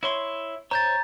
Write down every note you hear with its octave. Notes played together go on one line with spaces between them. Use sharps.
E4 C#5 C6
C5 C#5 A#5 G6 A6